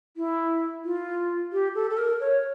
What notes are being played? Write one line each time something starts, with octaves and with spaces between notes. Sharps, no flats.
E4
F4
G4
A4
A4
A#4
C#5